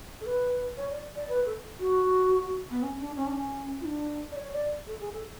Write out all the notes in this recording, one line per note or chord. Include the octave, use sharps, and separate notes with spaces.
A4
B4
C#5
D5
D5
B4
A4
F#4
B3
C#4
D4
C#4
D4
C#4
F4
D4
D5
C#5
D5
A4
G#4
A4